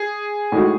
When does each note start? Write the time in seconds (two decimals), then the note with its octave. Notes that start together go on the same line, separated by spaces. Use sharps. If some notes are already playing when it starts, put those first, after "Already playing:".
Already playing: G#4
0.52 A2 G#3 D#4 F#4